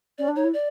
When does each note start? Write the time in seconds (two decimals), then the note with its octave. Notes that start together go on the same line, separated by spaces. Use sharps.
0.18 C#4 D5
0.28 D4
0.36 D#4 C#5
0.44 E4
0.54 D5